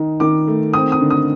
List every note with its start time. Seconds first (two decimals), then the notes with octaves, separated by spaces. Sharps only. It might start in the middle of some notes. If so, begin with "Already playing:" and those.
Already playing: D#3 D#4
0.20 D#3 D6
0.48 A3
0.73 C4 D#6
0.92 D#6
1.00 D3
1.10 D#6